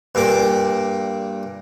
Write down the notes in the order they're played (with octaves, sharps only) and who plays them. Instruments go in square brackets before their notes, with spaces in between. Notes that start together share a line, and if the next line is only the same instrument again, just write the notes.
[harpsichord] G2 A#2 D6